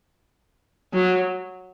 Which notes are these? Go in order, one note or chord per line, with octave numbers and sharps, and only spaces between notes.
F#3